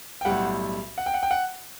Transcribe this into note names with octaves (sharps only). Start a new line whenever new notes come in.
G5
B1 A2 G3 F#5
F#5
G5
F#5
G5
F#5